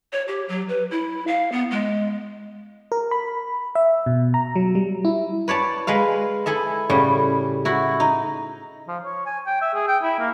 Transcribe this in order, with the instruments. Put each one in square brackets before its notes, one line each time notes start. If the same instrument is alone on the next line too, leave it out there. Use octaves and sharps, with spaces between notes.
[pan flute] C#5
G4
F#3
B4
E4
F5
B3
G#3
[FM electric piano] A#4
B5
E5
B2
A#5
F#3
G3
E4
[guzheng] B4 C#5 D5 A5
G#3 B4 F5
E4 G#4 A4 E5
A2 C#3 G3
E4 F#4
D#4
[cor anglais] F3
C#5
G#5
G5
E5
G#4
G5
E4
A#3